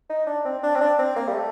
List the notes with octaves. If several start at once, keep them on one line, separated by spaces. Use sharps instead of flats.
D#4
D4
C4
D4
C4
D4
C4
A#3
G3
A3